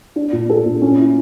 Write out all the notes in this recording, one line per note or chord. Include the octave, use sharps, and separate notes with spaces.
D4
A#2
A4
A#2
C#4
E4